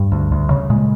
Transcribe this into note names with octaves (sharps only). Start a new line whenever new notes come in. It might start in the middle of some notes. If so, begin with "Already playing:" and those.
Already playing: G2 G3
D2
D2
C#3
A#2 G#3